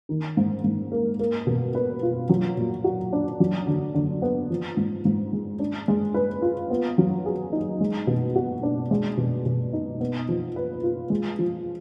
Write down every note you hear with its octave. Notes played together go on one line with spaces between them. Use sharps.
D#3
G#2
G#2
A#3
A#3
B2
B4
F4
F#3
A#2
F#4
D4
F#3
D3
D3
B3
F3
G#2
G#2
G#3
D4
G#3
B4
F4
B3
F#3
G#4
D#4
G#3
B2
F#4
D4
G#3
B2
B2
D#4
B3
F3
B4
F4
G#3
F3